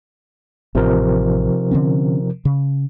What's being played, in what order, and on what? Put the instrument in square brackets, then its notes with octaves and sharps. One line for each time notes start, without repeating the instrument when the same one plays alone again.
[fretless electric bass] A1 [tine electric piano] C3 F3 A#4
[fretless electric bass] D3 C4 C#4
C#3